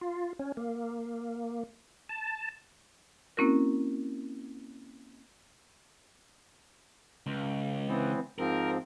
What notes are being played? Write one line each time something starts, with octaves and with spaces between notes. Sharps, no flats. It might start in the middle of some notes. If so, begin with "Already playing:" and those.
F4
C#4
A#3
A5
A#3 C4 C#4 E4 F#4 A#4
C#2
E3 B3 C4
G#2 F3 C4 A#4